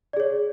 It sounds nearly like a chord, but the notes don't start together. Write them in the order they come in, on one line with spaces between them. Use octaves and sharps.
D5 G#4 C#5